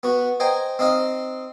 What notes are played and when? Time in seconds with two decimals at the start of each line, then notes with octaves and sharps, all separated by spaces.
0.03 B3 F#4
0.40 C5 D#5 G5 G#5 A#5
0.79 C4 D#4 D#5 F5